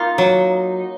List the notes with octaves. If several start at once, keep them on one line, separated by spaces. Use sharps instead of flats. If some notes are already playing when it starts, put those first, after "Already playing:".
Already playing: A#3 D#4 F4
F#3